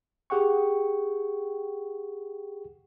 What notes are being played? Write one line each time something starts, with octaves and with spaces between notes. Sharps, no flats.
G4 G#4 F#5 G5 C#6